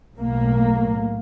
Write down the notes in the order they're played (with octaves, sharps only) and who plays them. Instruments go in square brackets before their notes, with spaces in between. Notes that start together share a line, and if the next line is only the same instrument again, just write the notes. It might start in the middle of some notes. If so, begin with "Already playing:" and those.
[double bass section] B1 A2 A#3